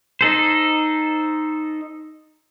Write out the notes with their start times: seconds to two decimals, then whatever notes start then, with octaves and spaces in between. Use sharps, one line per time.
0.21 D#4 A4 C5